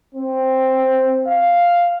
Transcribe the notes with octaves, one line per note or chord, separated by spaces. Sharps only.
C4
F5